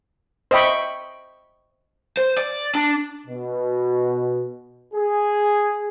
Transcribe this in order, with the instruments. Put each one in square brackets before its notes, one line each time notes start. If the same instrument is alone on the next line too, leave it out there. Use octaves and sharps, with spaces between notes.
[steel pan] C5 D#5 E5 G5 B5 C#6
[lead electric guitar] C5
D5
D4
[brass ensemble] B2
G#4